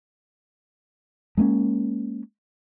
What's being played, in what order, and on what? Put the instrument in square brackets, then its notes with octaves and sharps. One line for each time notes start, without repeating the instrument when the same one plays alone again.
[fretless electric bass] G#3 A#3 B3 C#4